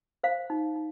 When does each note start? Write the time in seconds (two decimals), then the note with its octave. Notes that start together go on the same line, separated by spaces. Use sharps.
0.23 C5 F5
0.50 D#4
0.76 D#4